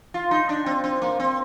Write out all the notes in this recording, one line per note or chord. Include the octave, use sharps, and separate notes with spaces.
F4
D#4
D4
C4
C4
A#3
C4